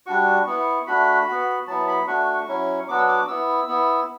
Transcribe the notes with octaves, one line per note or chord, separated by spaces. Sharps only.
G3 D4 F#4 C#6
B3 E4
A3 D4 F#4 B5
B3 F#4
F#3 B3 E4 A5
B5
A3 D4 F#4 C#6
F#3 C#4 E4
F#3 B3 D4 F#4 D6
E6
D6
B3 E4 E6
B3 E4